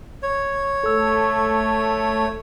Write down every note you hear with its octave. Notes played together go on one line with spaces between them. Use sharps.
C#5
A3 A4 E6